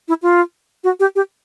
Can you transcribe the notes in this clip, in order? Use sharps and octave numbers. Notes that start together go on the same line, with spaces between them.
E4
F4
F#4
G4
G4